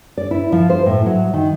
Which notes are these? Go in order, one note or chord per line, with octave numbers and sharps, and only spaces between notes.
D5
E4
F3
C5
A2
F#3
D#3